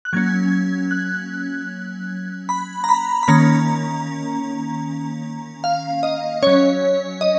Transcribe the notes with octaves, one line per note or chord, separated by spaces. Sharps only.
F#6
F#3 A#3 C#4 G#6
G#6
F#6
B5
A#5
B5
B5
D#3 A#3 C#4 A#5
F5
D#5
F#3 C#4 C#5
D#5